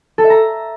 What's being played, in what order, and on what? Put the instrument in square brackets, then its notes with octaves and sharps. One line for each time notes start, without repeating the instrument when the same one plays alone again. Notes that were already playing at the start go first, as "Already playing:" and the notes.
[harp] A4
E5
A#5